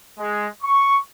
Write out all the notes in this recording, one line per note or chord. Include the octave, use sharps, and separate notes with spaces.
G#3
C#6